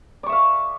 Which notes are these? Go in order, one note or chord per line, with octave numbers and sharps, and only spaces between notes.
D5 E5 F5 C#6